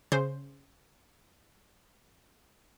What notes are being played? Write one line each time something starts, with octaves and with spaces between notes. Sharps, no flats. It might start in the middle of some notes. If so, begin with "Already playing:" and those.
C#3 C5